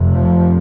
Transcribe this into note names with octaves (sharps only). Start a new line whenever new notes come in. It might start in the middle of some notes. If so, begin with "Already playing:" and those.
Already playing: F1 F2 C3
F3